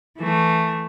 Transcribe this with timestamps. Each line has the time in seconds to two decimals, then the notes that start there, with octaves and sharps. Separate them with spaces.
0.17 E3 A3